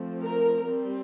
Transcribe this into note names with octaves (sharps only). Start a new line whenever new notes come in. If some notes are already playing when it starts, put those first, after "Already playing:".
Already playing: F3 A3 C4
A#4
G3 C4